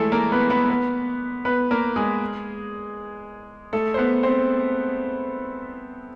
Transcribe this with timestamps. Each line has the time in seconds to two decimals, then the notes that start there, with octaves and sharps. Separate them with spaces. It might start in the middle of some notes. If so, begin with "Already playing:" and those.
Already playing: E3 G#3 A3 E4 A4
0.12 A#3 A#4
0.32 B3 B4
0.50 B3 B4
0.70 B3 B4
1.45 B3 B4
1.71 A#3 A#4
1.96 G#3 G#4
3.73 A3 A4
3.94 C5
3.97 B3 B4
4.23 C4 C5